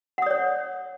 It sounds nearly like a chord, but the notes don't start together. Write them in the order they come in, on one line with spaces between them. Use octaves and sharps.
F#5 D#6 D5 C#5